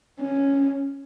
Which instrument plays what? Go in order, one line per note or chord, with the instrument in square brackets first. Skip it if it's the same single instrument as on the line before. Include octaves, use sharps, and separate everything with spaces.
[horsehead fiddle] C#4